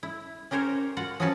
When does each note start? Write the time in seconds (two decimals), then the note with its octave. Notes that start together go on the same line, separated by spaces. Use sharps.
0.03 E4
0.51 C#4 G4 A#4 C5 C#5
0.97 F4 F#4 F#5
1.20 F3 F#3 C#4 F#4 B4 A5